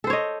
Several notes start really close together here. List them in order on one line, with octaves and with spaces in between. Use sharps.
A4 C5 C#5 D#5